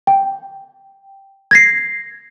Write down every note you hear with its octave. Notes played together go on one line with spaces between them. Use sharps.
G5
G#6 A#6 C7